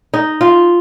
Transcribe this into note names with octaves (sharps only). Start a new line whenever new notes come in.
D#4
F4